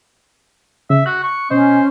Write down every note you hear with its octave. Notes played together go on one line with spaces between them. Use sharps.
C#3 E5
F#4 F#6
C#6
B2 C#4 C5 D#5